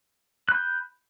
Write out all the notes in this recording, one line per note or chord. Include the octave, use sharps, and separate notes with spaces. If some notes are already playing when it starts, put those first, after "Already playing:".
B5 F#6 G6